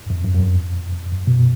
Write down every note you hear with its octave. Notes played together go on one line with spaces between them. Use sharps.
F2
F#2
F#2
F2
F#2
B2